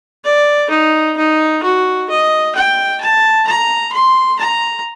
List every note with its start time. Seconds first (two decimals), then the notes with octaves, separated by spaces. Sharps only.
0.25 D5
0.70 D#4
1.17 D#4
1.63 F#4
2.09 D#5
2.55 G5
3.01 A5
3.47 A#5
3.93 C6
4.39 A#5